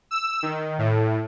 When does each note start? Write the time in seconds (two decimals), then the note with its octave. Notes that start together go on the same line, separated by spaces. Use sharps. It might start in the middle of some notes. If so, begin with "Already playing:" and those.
0.11 E6
0.43 D#3
0.78 A2